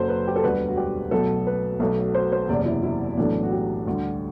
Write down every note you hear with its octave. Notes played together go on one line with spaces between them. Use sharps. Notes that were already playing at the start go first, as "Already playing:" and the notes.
Already playing: F#1 F#2 F#3 A4 C5
B4
G4
A4
E1 D2 D3 G3 B4
F#4
G4
B1 B2 F#3 A3 A4
B4
B1 B2 F#3 A3
C5
C5
F#1 E2 C3 D5
E4
E4
B1 A2 E3 A3 D4
F#4
G4
D2 D3 G3